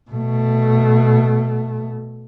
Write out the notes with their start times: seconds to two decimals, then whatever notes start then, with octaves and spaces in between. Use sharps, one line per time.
0.10 B2 A3